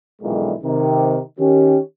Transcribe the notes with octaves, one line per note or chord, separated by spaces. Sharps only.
B1 F2 A#2 D3 E3 G#3
C3 D#3
D#3 C#4 G4